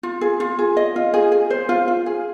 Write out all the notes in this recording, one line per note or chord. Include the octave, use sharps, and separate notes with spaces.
F4
G#4
F4
G#4
D#5
F4
G#4
G#4
C5
F4
F4
G#4